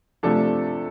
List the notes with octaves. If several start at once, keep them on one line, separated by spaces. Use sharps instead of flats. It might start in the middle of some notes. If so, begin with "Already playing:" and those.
C3 F3 A3 D4 A4